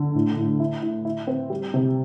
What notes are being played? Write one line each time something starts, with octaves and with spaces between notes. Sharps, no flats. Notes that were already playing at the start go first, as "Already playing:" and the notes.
Already playing: D3
A2
A2
E4
E4
E4
C4
G3
C3